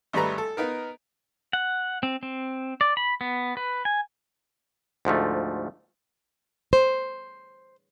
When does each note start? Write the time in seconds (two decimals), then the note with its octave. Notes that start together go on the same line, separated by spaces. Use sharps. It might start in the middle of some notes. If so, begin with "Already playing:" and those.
0.13 G#1 G3 A3 B4 A#5
0.38 A4
0.57 B3 D#4 A#4
1.53 F#5
2.03 C4
2.23 C4
2.81 D5
2.97 B5
3.21 B3
3.57 B4
3.85 G#5
5.05 D2 G#2 F3 A3
6.73 C5